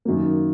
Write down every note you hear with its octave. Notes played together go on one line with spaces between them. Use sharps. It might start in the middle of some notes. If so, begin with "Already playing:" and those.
F#2 D#3 F#3 A#3